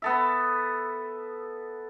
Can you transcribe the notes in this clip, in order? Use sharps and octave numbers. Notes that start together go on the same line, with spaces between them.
B3 A4 E5